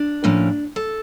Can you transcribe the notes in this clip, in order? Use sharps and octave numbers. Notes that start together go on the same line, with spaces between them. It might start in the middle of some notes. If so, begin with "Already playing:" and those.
Already playing: D4
A2 F3 A#3 C#4
A4